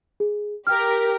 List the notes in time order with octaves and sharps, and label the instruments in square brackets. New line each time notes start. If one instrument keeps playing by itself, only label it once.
[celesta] G#4
[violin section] G4 A#4 [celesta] G5 F6